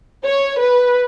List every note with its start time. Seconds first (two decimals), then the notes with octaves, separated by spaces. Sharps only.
0.24 C#5
0.60 B4